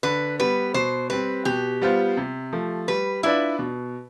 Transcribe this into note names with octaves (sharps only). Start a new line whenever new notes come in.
D3 B4
G3 B3 B4
B2 C5
G3 C4 B4
B2 G4
G3 B3 F4 C5
C3
F3 A3
G3 B4
D4 E4 F4 B4 D5
B2